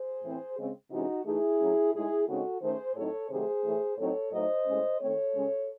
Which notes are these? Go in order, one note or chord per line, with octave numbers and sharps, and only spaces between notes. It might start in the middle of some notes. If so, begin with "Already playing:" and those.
Already playing: G#4 C5
A2 E3 C4
C#3 G#3 C4
C3 E3 G#3 C#4 D#4 F#4
E3 A3 D#4 E4 G#4
A2 F#3 C#4
A2 G#3 D#4 E4 G#4
C#3 G#3 C4 D#4 F#4 A4
D#3 A3 C#4 G#4 C5
A2 F#3 C4 D#4 A4 C#5
C3 D#3 F#3 A3 G#4 C5
A2 E3 A3
A2 F#3 C4 D#4 A4 C#5
A2 F#3 A3 D#4 C5 D#5
A2 G#3 C#4
D#3 A3 C4 A4 C#5
C#3 G#3 C#4